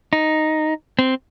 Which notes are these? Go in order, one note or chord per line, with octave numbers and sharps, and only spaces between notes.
D#4
C4